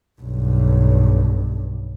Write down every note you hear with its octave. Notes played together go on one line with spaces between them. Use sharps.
B1 G2